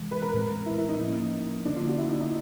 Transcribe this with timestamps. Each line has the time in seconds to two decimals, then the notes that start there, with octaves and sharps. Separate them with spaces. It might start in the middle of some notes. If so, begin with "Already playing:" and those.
Already playing: C3 E3 G#3
0.11 B4
0.22 A#4
0.33 A2 E3 G#3 C4
0.66 E4
0.78 E4
0.89 D#4
1.00 F3 A#3 C#4
1.65 D3 F#3 A#3 C#4 D4
1.76 F4
1.87 F#4
1.98 E4
2.09 D#4
2.20 D#4